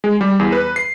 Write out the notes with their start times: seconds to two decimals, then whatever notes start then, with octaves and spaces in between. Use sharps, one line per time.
0.04 G#3
0.21 G3
0.39 E2
0.52 B4
0.76 C7